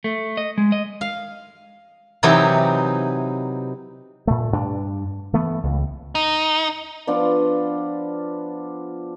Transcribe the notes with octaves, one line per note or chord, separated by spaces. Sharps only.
A3
D#5
G#3
D#5
F5
C3 E3 F#3 D#4 E4 G4
A#2 A3
G2 D4
E3 A3 B3
C#2
D#4
F3 B3 D4 F4